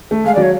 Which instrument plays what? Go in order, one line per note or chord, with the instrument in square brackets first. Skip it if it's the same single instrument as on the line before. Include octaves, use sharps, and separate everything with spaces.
[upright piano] A3
[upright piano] G#3 [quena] F5
[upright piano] F#3 [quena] D5
[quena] C#5